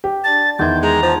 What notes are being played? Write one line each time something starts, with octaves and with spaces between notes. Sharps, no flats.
G4
D4 D5 A5 A6
E2 D#3 B3 E5 C6 G6 G#6
G#3 A#5
F3 D#4 A5 C6